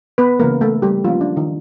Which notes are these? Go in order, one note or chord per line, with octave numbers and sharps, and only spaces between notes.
B3 B4
C#3 E3 G#3 A#3 A#4
A3 A4
G3 G4
D#3 F3 F#3 A#3 C#4 F4
D4
D#3 D#4